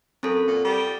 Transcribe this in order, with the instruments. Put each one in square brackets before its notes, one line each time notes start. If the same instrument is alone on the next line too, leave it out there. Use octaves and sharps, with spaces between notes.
[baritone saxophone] F#2 [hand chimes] C4 A4
[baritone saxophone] A#2
G3